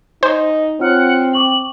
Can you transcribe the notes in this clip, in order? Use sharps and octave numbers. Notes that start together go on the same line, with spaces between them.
D#4 C5 G#5
C4 F4 C#5 F#5 F6
G5 C#6 D6 F#7